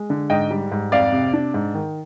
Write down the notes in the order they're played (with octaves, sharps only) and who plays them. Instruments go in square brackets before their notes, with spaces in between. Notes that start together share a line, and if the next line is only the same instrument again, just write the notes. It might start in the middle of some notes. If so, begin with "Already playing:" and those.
Already playing: [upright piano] G#3
D3
G#2 D#5 G5
G3
G#2
F2 D5 F5
C3
D4
G#2
D#3